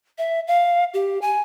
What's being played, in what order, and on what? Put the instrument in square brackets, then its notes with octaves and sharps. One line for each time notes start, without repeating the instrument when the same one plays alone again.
[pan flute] E5
F5
G4
G#5